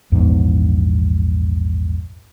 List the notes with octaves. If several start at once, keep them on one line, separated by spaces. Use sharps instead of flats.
A#1 E2 G#2 B3